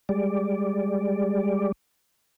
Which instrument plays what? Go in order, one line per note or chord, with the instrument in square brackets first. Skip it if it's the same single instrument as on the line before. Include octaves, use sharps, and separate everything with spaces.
[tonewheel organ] G3 G#3 D5